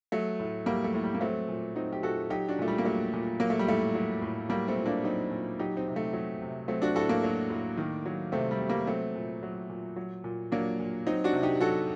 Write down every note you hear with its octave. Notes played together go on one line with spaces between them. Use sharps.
F#3 A3
A2
F#3 G3 A#3
A3
A2
G3
A#3
F#3 A3 C4
A#2
F#3 C4 D#4
G4
A#2 F#4 A4
F#3 D#4 G4
D4 F#4
A#2 A3
G3
A#3
F#3 A3
A#2
F#3 A#3
A3
G3
A2 A3
F#3
A2
F#3 G3 A#3
A3 C4
A#2
A#3 D4
F#3 C4 D#4
A#2
F#3 D#4 G4
C4 D#4
C3
A3 C4
F#3
C3
F#3 A3 C4
D4 F#4
A2 F#4 A4
A#3 D4
F#3
A2
D#3
F#3
C3 A3 C4
G3
C3
G3 A#3
F#3 A3 C4
A#2
F#3
A#2
F#3
A#2
F#3 A#3 D4
A#2
F#3 C4 D#4
D4 F#4
C3
D#4 G4
F#3 F#4 A4